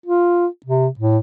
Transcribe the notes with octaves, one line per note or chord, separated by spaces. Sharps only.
F4
C3
A2